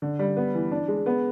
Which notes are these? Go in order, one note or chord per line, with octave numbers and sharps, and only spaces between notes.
D3
G3
B3
E3
D4
G#3
B3